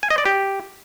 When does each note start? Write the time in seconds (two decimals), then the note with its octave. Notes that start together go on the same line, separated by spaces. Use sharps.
0.03 G#5
0.10 D#5
0.18 D5
0.26 G4